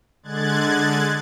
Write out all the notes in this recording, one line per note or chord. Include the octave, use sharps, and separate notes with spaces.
D3 G#3 F#6 G#6 A6